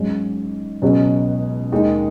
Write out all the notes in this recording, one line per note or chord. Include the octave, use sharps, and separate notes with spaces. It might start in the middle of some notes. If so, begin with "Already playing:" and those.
Already playing: G#2 F#3 C#4
C#2 B2 F#3 C#4 G#4
D#2 D#3 G#3 D#4